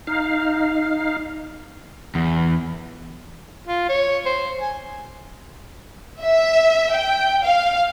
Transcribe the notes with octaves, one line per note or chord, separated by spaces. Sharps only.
D#4 F5
E2
F4
C#5
C5
G#5
E5
G5
F5